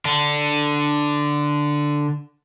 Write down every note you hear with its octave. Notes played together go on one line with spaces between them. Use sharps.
D3 D4